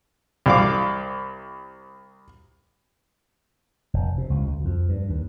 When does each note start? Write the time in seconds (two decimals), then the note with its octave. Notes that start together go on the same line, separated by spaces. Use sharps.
0.46 C2 F5 D6
3.94 F1
4.18 C3
4.30 C#2
4.46 D2
4.65 F2
4.89 G2
5.10 D#2